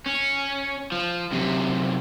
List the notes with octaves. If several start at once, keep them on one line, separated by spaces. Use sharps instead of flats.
C#4
F3
F#2 C3